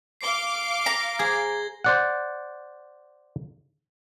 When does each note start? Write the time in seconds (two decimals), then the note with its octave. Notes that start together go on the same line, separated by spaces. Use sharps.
0.21 F5 D6 C7 G7
0.86 A#5
1.19 G#4 C5 G#6 A#6
1.84 C5 D5 F#5